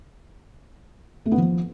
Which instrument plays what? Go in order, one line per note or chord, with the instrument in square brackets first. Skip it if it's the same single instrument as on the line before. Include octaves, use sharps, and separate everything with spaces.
[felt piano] A3
B3
F3